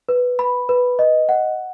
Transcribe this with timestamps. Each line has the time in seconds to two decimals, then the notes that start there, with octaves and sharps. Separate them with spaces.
0.09 B4
0.39 B5
0.69 B4
0.99 D#5
1.29 F#5